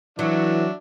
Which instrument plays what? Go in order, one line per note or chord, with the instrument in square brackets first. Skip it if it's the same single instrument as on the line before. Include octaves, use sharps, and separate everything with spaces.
[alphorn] E3 [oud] F#3 [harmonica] D4 F#4 E5